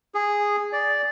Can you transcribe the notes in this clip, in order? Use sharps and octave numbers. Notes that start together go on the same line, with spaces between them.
G#4
D5